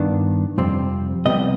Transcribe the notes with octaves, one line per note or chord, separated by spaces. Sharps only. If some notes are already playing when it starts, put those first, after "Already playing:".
Already playing: G2 D#3 B3 D4
F2 C3 G3 C4
C2 C3 G3 B3 D#5